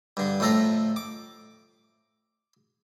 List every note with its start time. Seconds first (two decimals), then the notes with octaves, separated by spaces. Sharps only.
0.17 G2 D3
0.40 F2 A2 A3 A4 A#5
0.96 D6